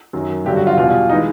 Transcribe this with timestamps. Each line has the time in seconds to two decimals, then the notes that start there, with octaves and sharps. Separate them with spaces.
0.13 F#2 D#3 F#3
0.45 G2 D3 F#3 G4
0.56 F#4
0.67 F4
0.77 E2 B2 G3 F4
1.09 D#4
1.12 E3 G#3